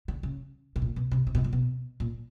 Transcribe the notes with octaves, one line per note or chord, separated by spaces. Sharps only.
D3
C#3
B2
A#2
B2
C3
C3
B2
A#2
B2
A#2